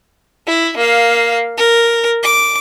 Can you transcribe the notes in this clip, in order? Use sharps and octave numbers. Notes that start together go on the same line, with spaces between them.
E4
A#3 F5
A#4
D6